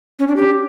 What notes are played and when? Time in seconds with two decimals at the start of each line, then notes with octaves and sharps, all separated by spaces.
0.19 C#4
0.28 D4
0.36 G4